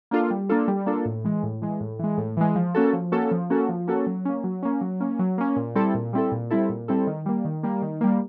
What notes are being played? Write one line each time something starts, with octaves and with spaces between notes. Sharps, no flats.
A#3 D4 F4 A4
G3
A#3 D4 F4 A4
G3
A#3 D4 F4 A4
A2
E3 G#3
A2
E3 G#3
A2
E3 G#3
A2
E3 G#3
F3
A#3 C#4 F#4 A4
F3
A#3 C#4 F#4 A4
F3
A#3 C#4 F#4 A4
F3
A#3 C#4 F#4 A4
F#3
A#3 C#4
F#3
A#3 C#4
F#3
A#3 C#4
F#3
A#3 C#4
A#2
G3 C4 E4 A4
A#2
G3 C4 E4 A4
A#2
G3 C4 E4 A4
A#2
G3 C4 E4 A4
D#3
G3 A#3
D#3
G3 A#3
D#3
G3 A#3